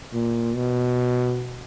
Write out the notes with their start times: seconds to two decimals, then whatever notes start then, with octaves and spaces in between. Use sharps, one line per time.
0.13 A#2
0.56 B2